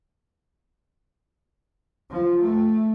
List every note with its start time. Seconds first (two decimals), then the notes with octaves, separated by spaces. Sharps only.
2.11 F3
2.41 A3